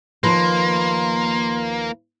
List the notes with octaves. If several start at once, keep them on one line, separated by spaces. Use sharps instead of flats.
D#2 F3 A#3 B4 C6